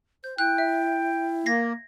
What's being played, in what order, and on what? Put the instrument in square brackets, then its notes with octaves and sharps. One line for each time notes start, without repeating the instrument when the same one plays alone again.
[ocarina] C5 [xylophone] G6
[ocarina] E4 [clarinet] G5 [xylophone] F#6
[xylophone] E5
[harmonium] A#3 [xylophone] G#6 A#6 C7